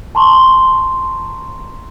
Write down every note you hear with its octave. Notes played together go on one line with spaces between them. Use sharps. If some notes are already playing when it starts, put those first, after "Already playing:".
A5 A#5 C6 C#6